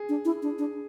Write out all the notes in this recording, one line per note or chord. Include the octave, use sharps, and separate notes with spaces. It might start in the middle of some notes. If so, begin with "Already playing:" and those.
Already playing: G#4
D4
E4
D4
D4